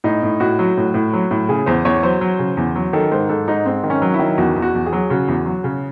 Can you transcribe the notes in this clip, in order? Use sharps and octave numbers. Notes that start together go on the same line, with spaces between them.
A2 D#4
A2
A2 F#4
F#3
A2
A2
F#3
A2
C#3 G#4
E2 C5
E2 C#5
F#3 C5
F#3
C#3
E2
F#3
D#3 A4
G#2 C5
G#2 A4
G#2 D#4
G#2 C4
D#3
C#4
F#3
E4
D#3
E2 F#4
E2
F#4
E2
G#4
F#3
C#3 F#4
E2
F#3
C#3